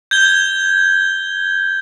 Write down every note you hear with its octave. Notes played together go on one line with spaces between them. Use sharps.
G6 G#6 G7